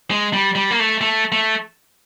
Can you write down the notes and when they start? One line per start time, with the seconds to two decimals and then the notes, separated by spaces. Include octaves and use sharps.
0.10 G#3
0.33 G3
0.55 G3
0.71 A#3
0.79 A3
1.01 A3
1.32 A3